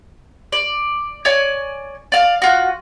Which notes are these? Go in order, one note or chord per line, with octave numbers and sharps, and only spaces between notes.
D5
C#5 D5 G#5
D5 F5
F4 F#4